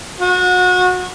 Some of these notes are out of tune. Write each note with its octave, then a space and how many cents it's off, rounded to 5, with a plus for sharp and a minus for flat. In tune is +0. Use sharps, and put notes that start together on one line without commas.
F#4 -30